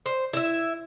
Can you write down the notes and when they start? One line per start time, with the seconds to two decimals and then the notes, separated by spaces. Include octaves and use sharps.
0.06 C5
0.33 E4 E5